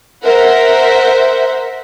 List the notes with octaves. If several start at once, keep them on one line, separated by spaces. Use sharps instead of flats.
A#4 C5 E5 F#5